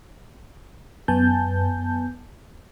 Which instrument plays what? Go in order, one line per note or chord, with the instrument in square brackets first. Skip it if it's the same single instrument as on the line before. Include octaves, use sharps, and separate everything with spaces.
[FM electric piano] F#2 B3 G#5 A5 G6